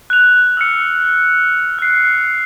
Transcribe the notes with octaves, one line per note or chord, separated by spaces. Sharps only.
F#6 F7
E6 F6 C#7
F#6 C7